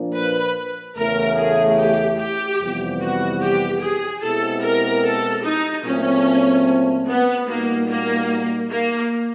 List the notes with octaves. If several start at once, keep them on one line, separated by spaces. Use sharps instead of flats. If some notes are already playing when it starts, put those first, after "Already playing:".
Already playing: A#2 F3 A#3 D4
B4
E2 C#3 E3 A3 A#4
G#4
G4
G4
F2 C3 E3 G3 B3
F#4
G4
G#4
B2 G#3 C4 E4 G4 A4
A#4
A4
D#4
A#2 F#3 A3 C4 C#4
B3
A#2 G3 A#3 B3 D#4 F#4
A#3
A#3